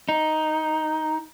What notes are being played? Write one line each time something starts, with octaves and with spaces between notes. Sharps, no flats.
D#4